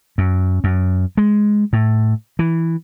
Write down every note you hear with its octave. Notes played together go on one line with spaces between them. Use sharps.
F#2
F#2
G#3
A2
E3